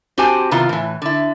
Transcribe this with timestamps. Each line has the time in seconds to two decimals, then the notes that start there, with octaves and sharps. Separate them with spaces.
0.18 C4 F#4 G4 C5 G#5 A5
0.51 C3 D#3 B3 E4 F4
0.69 A2 E3
1.02 D3 E4